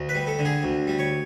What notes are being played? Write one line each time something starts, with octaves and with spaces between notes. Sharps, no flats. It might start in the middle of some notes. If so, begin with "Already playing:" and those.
Already playing: D2
B4
G3
A4
D3
G#4
D2
G3
C#5